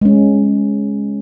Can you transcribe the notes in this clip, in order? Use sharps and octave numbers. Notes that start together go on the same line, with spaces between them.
G#3 C#4